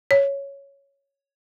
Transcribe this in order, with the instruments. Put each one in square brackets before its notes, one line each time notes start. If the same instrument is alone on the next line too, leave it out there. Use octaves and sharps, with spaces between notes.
[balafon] C#5